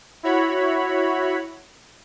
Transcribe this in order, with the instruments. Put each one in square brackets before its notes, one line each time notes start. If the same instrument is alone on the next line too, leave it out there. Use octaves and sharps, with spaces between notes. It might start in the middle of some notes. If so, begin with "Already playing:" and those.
[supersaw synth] E4 F#4 C#5 B5